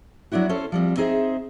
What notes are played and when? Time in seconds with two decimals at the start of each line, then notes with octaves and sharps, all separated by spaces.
0.32 F#3 B3 D4 E4 F#4
0.49 C#4 A4 C5
0.72 F3 G3 C4
0.97 C4 D#4 G#4 B4 C5 E5